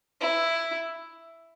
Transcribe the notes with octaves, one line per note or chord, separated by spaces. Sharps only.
E4